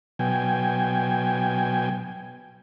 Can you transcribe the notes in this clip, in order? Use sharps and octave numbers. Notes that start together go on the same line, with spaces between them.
B2 F#3 G5 G#5